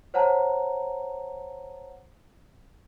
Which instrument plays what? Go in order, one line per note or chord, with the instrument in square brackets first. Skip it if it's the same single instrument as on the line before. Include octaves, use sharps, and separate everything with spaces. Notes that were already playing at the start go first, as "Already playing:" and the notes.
[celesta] C5 C#5 F#5 A5 A#5